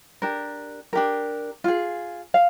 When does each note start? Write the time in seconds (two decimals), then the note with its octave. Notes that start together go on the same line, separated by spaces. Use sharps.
0.22 D4 G4 A#4
0.93 D4 G4 A#4
1.64 F4 G#4
2.34 F5